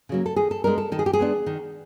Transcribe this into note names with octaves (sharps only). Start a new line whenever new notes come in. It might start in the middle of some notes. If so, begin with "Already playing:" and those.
C#3 F#3 A#3
A4
D#3 G#4
A4
G#3 B3 D4 A#4
A4
D#3 A4
G#4
G4
G#4
G#3 B3 D4
D#3